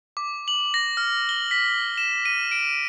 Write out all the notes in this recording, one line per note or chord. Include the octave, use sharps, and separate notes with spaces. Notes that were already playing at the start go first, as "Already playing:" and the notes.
D6
F#7
A#6
F6
G7
B6
E7
D#7
D7